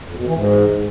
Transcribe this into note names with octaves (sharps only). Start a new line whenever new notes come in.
F2
B2
E3
G#2